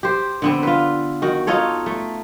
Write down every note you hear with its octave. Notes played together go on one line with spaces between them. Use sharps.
G4 C5
D3 B3 C4
F4 B4
D#3 F#4
D#4 F4 A4 C#5
A3